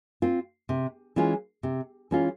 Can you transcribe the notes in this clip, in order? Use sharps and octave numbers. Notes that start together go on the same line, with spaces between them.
C4 F4
C3
E3 G#3 C#4 F4
C3
E3 G#3 C#4 F4